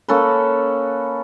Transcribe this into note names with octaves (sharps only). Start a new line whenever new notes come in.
A#3 C#4 A4 B4